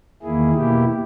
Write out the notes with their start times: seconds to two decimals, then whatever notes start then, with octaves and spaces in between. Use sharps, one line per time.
0.22 E2 D#3 A#3 E4 G#4
0.54 B2 A#3 E4 G4